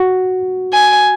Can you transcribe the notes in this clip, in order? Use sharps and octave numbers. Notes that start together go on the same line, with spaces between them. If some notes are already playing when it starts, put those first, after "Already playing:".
Already playing: F#4
G#5